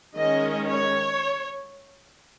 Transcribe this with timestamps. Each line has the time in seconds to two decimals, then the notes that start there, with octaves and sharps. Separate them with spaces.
0.16 D#3 G#3 C#4 D#5
0.70 C#5